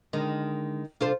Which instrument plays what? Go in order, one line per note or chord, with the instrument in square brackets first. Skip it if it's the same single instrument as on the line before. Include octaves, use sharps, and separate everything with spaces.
[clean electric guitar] D3 G#3 [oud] D#3
[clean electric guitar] C2 F#2 D4 [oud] F4 A4 C5